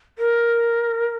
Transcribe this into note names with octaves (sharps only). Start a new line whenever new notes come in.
A#4